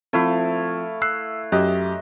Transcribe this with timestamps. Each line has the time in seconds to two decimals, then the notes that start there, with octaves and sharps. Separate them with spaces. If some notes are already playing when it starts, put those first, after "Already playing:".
0.13 F3 A3 C4 E4 F5
1.02 E6 F#6 C7
1.52 F#2 G4 D#5 E5 F#6